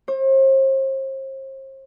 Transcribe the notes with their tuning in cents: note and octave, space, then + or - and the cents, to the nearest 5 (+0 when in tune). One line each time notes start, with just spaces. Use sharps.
C5 +40